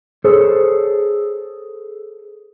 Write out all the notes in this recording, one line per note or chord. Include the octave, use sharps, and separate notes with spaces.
G#4 A4 C5 C#5